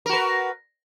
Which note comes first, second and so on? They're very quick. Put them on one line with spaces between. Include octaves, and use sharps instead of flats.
A#4 F#4 B4